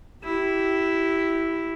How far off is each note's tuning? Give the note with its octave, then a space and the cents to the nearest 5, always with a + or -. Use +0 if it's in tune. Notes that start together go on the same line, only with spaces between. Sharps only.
E4 +0 G4 -25